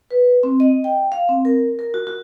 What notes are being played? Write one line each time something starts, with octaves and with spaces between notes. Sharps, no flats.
B4
C4
D#5
G5
F5
C4
A#4
A#4
F#4
F#4